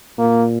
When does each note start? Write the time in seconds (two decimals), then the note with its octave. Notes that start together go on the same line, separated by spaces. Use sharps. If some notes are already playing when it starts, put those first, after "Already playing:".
0.19 A#2 A#3